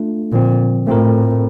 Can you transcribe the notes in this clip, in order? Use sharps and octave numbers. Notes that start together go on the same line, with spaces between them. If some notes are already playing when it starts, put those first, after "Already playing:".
Already playing: A3 D4 F4
A#2 D3 F3 C4
A2 A3 C4 F4 A#4